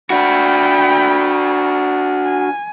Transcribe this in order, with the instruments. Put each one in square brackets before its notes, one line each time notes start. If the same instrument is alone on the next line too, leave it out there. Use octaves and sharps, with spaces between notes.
[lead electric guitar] D4 F#4 [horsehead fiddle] G5 B5
[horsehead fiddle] G#5